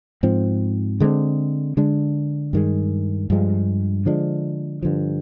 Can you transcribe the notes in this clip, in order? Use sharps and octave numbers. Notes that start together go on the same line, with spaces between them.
G#2 F3 C4
D3 G#3 C4
D3 G#3 D4
G2 D#3 G#3
G2 F3 G#3
D3 F3 G#3 D4
G2 D3 F3